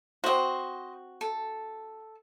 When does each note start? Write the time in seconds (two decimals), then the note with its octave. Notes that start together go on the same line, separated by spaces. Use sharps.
0.24 C4 F#4 C5 D#5
1.21 A4